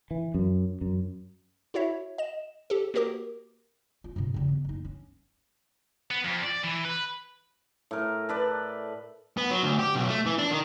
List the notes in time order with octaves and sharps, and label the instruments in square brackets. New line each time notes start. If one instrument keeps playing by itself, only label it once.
[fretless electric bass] E3
F#2
F#2
[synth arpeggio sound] E4 F#4 C#5 E5
D#5 E7
G4 A4
A#3 F#4 G4 A#4 D6
[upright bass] F4
G2 C3
E2 C#3
B3
F#1 D#4
C#4
[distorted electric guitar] B3
F2
D5
E3
B4
[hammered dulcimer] A2 A#4
A4 B4 D5
[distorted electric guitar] B3
F#3
D2
G4
B1
A3
E3
D4
D#3